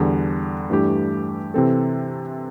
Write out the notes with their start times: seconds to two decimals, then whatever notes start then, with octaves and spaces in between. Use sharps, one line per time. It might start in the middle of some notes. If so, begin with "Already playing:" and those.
Already playing: E2 D3 G3
0.70 G2 E3 A3 D4 G4
1.54 C3 E3 C4 A4